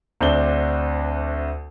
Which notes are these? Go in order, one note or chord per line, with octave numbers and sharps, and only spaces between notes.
D2 C4 D4 G7